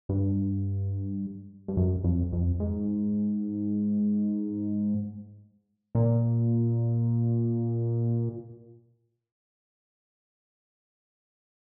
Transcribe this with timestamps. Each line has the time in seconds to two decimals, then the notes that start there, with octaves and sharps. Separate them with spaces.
0.09 G2
1.68 G2
1.77 F#2
2.04 F2
2.32 F2
2.60 G#2
5.95 A#2